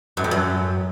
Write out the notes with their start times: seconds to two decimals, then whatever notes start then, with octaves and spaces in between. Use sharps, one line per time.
0.17 F#2
0.24 F2
0.31 F#2